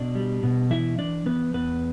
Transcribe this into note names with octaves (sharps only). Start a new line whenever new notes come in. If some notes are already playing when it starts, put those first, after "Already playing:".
Already playing: B2 D4 D5
G3
B2
E3 E4 E5
E3 D4 D5
E3 B3 B4
E2 B3 B4